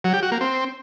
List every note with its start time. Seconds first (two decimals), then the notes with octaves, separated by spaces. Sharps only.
0.04 F#3
0.14 G4
0.23 F#4
0.32 A#3
0.41 C4